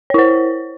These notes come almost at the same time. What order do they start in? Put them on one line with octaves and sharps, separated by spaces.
C#5 E4 C5